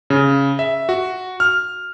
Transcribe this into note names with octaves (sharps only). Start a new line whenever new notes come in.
C#3
E5
F#4
F6